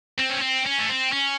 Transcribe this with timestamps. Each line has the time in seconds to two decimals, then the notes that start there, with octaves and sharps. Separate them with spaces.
0.20 C4
0.31 C#4
0.42 C4
0.67 C#4
0.79 A3
0.89 C4
1.13 C#4